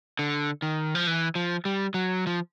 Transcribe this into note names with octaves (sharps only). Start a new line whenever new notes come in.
D3
D#3
F3
E3
F3
G3
F#3
F3